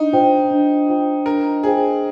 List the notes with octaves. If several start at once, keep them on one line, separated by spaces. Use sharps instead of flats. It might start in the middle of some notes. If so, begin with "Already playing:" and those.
Already playing: D4 D#4
F4 C5 G5
D4
F4 C5 G5
D4 A#4
F4 G#4 C5 G5